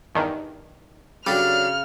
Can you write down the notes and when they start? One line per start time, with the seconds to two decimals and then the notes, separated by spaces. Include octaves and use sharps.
0.15 E2 G2 D#3
1.26 C#3 F#3 G3 D4 A4 F6